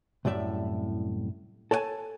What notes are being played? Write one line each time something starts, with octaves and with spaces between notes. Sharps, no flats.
C2 F#2 A2 D5 E5
A4 C#5 D5 F#5 G#5 A5